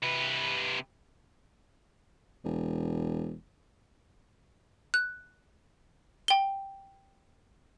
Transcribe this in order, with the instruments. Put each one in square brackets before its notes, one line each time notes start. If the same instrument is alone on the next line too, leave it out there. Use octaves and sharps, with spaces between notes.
[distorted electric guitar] C3 B4
[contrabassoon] E1
[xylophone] F#6
G5 G7